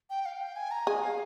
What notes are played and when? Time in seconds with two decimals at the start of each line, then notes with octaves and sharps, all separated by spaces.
0.10 G5
0.26 F5
0.41 G5
0.56 G#5
0.71 A#5
0.87 G#4 G#5
1.02 F5